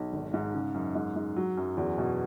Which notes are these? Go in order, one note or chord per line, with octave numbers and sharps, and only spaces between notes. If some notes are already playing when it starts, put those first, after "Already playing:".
Already playing: B1
G#1
G#2
C#3
F#2
G#2
G#2
F#3
F#2
E2
B2